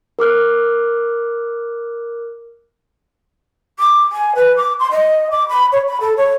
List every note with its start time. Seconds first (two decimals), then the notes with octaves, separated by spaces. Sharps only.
0.19 A#4 D6 F6 F#6
3.79 D6
4.12 G#5
4.36 B4
4.57 D6
4.79 C6
4.91 D#5
5.31 D6
5.49 B5
5.72 C#5
5.87 B5
6.01 A4
6.17 C#5